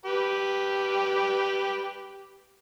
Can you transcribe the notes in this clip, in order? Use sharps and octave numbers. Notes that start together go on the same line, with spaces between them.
G4 B4